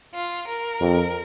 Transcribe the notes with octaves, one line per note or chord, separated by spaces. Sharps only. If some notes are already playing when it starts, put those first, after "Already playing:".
F4
A#4
F2